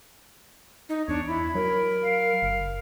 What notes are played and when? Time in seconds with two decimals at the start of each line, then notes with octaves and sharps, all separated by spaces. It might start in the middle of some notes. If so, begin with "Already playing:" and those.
0.89 D#4
1.08 E2 D4 C#5
1.29 E4 B5
1.55 F#3 A#4
2.04 F5
2.43 F#1